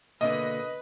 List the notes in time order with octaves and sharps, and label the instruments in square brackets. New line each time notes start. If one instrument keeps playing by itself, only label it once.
[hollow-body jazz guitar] B2 D3 A#3 [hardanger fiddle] B4 [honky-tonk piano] D#5